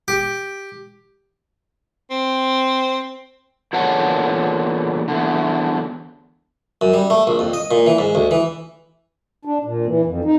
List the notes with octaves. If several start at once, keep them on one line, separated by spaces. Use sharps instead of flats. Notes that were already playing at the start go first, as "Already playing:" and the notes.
G4
C4
E2 A#2 D3 C#5 F#5 A5
E2 D3
F#2
G3
A3
A#1
F2
D#5
A#2
E3
G#2
D2
E3
D4
A#2
E3
F2
D#4